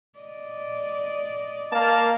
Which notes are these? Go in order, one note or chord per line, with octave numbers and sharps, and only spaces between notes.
D5 D#5
A#3 A#4 F5 A5